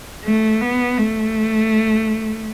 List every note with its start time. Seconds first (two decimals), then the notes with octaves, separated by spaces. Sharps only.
0.24 A3
0.61 B3
0.98 A3